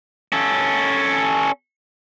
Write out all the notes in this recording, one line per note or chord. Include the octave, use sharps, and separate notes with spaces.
C#4 A4